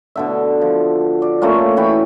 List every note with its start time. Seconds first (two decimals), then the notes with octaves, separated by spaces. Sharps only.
0.16 B2 D3 E5
0.61 F3
1.22 D5
1.42 A3 A#3 C#4 F4
1.77 E3 F#4 G5 B5